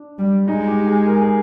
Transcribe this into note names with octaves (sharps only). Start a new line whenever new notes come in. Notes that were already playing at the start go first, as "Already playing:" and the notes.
Already playing: D4
G3
G#3 D#4
G4
G#4
A#4
G#4